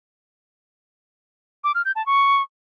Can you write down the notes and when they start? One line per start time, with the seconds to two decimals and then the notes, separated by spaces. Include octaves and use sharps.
1.64 D6
1.75 F6
1.85 G6
1.96 A5
2.06 C#6